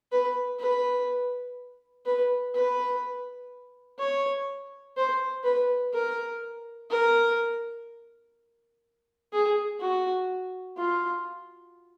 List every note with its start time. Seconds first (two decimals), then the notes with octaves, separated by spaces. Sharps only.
0.12 B4
0.59 B4
2.06 B4
2.54 B4
3.99 C#5
4.97 C5
5.44 B4
5.93 A#4
6.90 A#4
9.33 G#4
9.81 F#4
10.78 F4